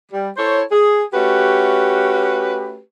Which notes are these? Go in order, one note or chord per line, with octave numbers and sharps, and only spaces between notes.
G3
E4 A4 C5 C#5
G#4
A3 C#4 F#4 G4 B4